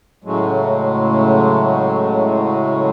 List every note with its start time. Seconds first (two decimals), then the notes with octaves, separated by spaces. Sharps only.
0.24 A2 C#3 F#3 G#3 A3